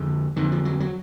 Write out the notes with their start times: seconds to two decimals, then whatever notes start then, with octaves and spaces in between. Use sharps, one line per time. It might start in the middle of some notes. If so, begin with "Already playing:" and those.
Already playing: F2 D3
0.36 F2 D3 D#3
0.52 F3
0.65 F#3
0.80 F#3